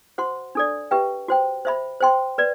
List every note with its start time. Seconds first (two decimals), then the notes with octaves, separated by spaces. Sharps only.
0.18 F#4 C5 F#5 C6
0.55 D4 A4 D5
0.91 G4 B4 E5 G5
1.28 F#4 C5 G5
1.65 C5 E5 B5
2.01 C5 G5 C6
2.38 B4 D5